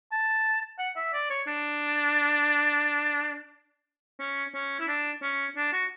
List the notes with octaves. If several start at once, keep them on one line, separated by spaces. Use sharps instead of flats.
A5
F#5
E5
D5
C#5
D4
C#4
C#4
E4
D4
C#4
D4
F#4